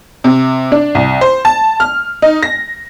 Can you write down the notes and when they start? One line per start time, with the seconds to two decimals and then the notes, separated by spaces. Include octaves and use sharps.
0.24 C3
0.72 D4
0.95 C2
1.21 C5
1.45 A5
1.80 F6
2.22 D#4
2.43 A#6